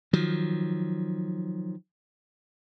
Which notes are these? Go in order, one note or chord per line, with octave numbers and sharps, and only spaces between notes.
D#3 F3 F#3